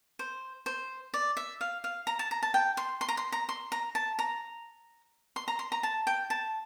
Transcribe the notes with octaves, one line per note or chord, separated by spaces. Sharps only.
C5
C5
D5
E5
F5
F5
A#5
A5
A#5
A5
G5
C6
C6
A#5
C6
A#5
C6
A#5
A5
A#5
C6
A#5
C6
A#5
A5
G5
A5